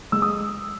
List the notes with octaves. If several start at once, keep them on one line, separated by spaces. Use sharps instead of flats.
G#3 E6
D#6